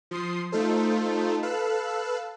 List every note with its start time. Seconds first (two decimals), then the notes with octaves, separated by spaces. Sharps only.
0.11 F3 C6 D#6 C7
0.52 A3 D#4 F4 A4 C5
1.43 A4 B4 F5 E6 F#6